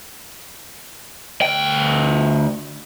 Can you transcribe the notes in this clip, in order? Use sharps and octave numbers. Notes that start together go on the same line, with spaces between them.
D2 G5